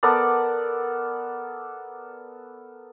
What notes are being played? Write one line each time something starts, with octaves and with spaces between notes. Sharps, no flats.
B3 A4 A#4 D5